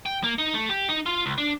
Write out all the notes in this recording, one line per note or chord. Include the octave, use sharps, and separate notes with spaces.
G5
A#3
D#4
A3
G4
D#4
F4
C#2
D4